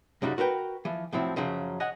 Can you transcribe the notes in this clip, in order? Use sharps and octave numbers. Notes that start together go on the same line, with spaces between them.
F#2 C#3 G3 D#4 F#4
F#4 A#4 B4 G5
E3 F3
A2 F3 F#3 C4 E4
F#2 C#3 F3 F#3
C#5 D#5 F#5 G#5